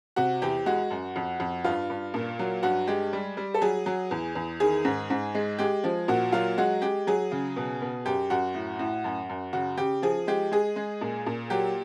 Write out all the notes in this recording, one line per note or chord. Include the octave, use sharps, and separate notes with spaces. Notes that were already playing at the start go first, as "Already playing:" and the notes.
C3 F#4
E2 G4
G#3 F#4
F#2
F2
F2
G2 F4
G2
A#2
F#3
G2 F#4
G#3 G4
G3
G3
A4
F#3 G#4
F#3
E2
E2
D#3 G#4
G#2
G#2
G#3
G#3 G4
F3
A#2 F#4
F#3 F4
G#3 F#4
G#3 G4
F#3 G#4
C#3
B2
B2
F#2 G4
F#2 F#4
A2
A2
F#2
F#2
C#3 F#4
C#3 G4
F3 G#4
G#3 G4
G#3 G#4
G#3
A#2
A#2
F#3 G4